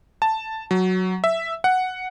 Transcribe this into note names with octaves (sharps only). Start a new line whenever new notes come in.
A5
F#3
E5
F#5